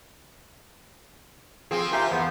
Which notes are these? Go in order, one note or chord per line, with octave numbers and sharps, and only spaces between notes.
F3 C4 G#4
F4 G4 A#4 C5 E5 G#5
E2 B3